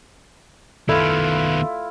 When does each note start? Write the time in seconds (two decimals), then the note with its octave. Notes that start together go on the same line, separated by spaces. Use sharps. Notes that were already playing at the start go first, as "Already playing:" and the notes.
0.89 D#3 B3 E4 F4 A4